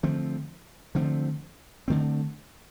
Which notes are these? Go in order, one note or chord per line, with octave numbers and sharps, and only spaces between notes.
D3 F3 A3 C4
D3 F3 A3 C4
D3 F3 A3 C4